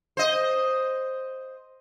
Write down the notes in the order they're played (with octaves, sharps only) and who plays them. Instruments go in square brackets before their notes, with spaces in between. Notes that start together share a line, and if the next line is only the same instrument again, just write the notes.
[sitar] C5 D#5